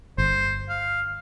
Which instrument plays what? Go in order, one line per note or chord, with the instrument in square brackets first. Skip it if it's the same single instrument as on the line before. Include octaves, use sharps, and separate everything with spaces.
[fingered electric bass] G1 [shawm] C5
[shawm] F5